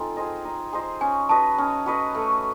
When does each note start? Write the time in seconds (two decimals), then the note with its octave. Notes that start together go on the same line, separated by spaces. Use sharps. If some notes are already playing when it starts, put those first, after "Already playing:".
Already playing: C4 D#4 F4 A4 G#5
0.17 G#4 C5 D#5
0.45 D#4
0.73 G#4 C5 D#5
1.01 C#4 G#5
1.29 F#4 B4 D#5 A5
1.58 C#4
1.86 F#4 B4 D#5
2.15 A3